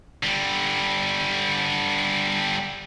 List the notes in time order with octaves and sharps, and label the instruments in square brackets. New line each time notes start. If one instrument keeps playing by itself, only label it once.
[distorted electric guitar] D3 G3